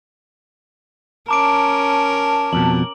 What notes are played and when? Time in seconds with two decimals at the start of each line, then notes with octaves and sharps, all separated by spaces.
1.28 C#4 A#4 A5 A#5 D6 D7
2.53 F2 B2 F#7